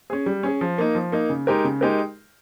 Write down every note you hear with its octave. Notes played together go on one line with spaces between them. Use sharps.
C#4 G#4
G3
C#4 G#4
F3
A#3 D#4
F3
A#3 D#4
C#3
G#3 D#4 G4 A#4
C#3
G#3 D#4 G4 A#4